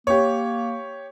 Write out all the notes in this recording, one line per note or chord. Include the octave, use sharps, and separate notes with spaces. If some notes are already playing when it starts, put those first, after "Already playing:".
A#3 G4 C#5